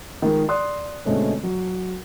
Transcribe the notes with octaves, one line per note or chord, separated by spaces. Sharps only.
D#3 F3 G#3
D5 C6 D#6 F#6
B2 D3 G#3 A3 C4 C#4
F#3